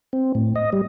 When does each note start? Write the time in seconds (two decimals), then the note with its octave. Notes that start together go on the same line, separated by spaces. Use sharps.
0.13 C4
0.35 A2
0.56 D#5
0.73 G3